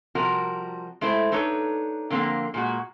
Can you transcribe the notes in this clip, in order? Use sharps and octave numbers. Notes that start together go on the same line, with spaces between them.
C3 F3 G3 F#4 A#4
G#3 A3 E4 C5
D4 D#4 A4 B4 C#5
D3 F3 A#3 C4
A#2 G#3 F#4